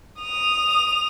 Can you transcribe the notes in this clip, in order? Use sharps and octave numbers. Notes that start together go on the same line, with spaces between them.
D#6 F7